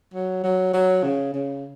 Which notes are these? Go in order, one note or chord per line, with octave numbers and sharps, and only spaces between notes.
F#3
F#3
F#3
C#3
C#3